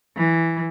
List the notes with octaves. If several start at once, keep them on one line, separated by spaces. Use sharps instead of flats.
E3